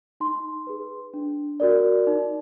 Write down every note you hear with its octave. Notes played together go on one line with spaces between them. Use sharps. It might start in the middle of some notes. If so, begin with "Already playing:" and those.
D#4 C6
G#4 B4
D4
F#4 A#4 D5
D#4